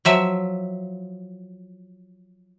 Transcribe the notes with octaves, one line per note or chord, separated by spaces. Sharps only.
F3 F#3 E5